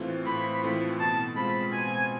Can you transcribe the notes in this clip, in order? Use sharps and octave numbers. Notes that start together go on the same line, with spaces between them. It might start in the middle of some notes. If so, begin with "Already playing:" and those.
Already playing: A2 E3 A3 C4 F4
A2 B5
E3 A3 C4 F4
B2 A5
G#3 C4 F4 B5
B2 G#5